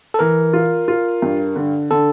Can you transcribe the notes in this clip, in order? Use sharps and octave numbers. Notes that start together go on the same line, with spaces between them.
A4
E3 A#4
F4
F4
G2
D3
D3 A4